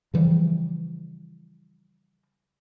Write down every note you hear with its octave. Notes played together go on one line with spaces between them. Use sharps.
C#3 E3 F3 G3